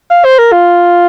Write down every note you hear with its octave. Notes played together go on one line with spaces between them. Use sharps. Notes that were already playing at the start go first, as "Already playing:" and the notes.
F5
C5
A#4
F4